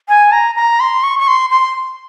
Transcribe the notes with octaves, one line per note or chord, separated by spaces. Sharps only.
G#5
A#5
A#5
C6
C#6
C#6
C6
C6